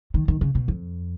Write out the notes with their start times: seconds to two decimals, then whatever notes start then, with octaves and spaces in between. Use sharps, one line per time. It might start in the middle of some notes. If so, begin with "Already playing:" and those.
0.14 D#3
0.28 D#3
0.41 C#3
0.55 B2
0.68 F2